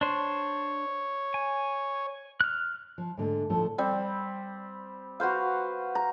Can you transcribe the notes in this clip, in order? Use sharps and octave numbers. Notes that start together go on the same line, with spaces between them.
D4 C5 C#5
G#5
F6 F#6
F3
G#2 D3 A3
D2 A2 F3 A3 A4
G3 C4
F#4 B4 C5 F5
A#5